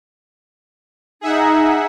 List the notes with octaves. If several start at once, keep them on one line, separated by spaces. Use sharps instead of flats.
D#4 G#4 E5 F#5